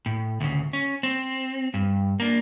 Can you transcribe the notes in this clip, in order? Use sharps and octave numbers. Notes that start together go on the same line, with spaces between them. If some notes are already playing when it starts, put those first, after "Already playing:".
A2
D2 C#3
C#4
C4
G2
A#3 D4